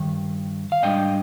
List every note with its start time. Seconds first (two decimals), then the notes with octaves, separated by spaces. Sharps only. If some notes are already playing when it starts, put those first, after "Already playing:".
Already playing: G2 D#3
0.72 F5
0.82 G#2 G3 D4 D#5 G5